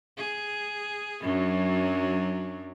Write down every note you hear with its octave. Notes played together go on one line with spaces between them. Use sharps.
G#4
F#2 F#3 D4